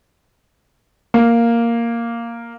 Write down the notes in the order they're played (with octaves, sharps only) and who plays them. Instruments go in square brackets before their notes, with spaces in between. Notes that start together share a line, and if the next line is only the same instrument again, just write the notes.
[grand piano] A#3